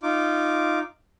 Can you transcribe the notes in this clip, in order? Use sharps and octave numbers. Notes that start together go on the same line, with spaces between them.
D#4 F4 D6